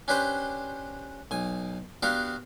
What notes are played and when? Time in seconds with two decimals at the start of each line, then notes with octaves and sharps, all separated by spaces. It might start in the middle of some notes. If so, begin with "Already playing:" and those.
0.08 C#4 D4 G4 B4 C5 G5
1.31 B1 G#5
2.03 B3 D4 F#4 G4 F5